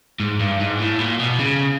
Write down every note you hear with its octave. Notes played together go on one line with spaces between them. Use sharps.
G#2
G2
G#2
A2
A#2
B2
C#3